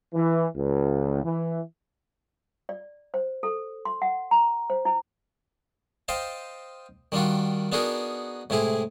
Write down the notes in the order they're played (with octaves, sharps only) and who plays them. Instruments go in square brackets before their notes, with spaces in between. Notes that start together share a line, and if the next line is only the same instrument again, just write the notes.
[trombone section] E3
C#2
E3
[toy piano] D5
C5
A4
C6
F#5
A#5
C5
E4
[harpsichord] C5 D#5 F5 G5 A5
D#3 G3 D4 F4 F#4
B3 D4 D#4 F#4 G#4 A#4
A2 C3 G#3 E4 G#4